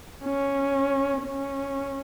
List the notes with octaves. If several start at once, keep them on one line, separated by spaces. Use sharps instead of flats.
C#4
C#4